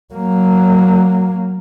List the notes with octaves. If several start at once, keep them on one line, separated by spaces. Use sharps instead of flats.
F#3 A#3